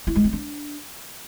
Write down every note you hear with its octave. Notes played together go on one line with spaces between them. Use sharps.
E4
G#3
C4
D4